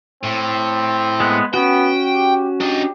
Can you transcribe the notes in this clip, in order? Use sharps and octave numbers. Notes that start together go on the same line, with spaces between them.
A2 C4
G#3 B3 F#5
B3 C#4 F#4 G5
G4
D4 G4 D#5